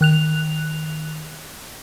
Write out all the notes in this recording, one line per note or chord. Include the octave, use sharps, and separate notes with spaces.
D#3 F#6 F7